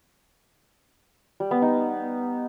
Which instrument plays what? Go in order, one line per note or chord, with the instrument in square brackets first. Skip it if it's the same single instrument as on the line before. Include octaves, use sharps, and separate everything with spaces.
[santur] G3
B3
D#4